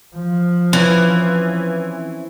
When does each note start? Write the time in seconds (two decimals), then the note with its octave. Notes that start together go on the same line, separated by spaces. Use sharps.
0.16 F3
0.73 E3 C4 C#4 E4